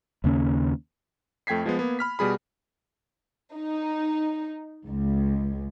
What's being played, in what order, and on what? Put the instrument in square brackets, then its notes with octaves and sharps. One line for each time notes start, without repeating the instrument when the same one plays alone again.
[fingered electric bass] D#2 C#3 A#3 C#4
[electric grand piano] F2 A3 G5 G#6 B6 C7
F3 G#3 B3
A#3 B3
B5 F6 B6
B2 G3 G#4 B5
[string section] D#4
C#2